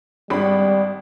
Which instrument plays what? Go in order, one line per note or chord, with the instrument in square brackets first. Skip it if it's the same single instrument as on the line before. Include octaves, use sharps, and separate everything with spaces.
[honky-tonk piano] G#1 D4 B5 [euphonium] G3